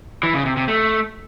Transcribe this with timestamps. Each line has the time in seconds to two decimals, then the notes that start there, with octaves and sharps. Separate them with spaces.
0.23 E3
0.34 C#3
0.46 C3
0.57 C3
0.68 A3